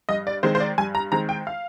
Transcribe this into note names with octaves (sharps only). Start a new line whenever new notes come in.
G2 D#5
D5
D#3 G#3 C4 C5
C5
D5
G2 G#5
A#5
D#3 G#3 C4 A#5
G5
F5